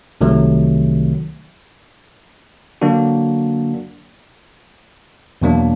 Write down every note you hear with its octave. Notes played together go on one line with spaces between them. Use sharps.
C2 C3 D#3 F#3 A3
D3 F#3 A#3 D4 F#4
E2 B2 F#3 A#3 D4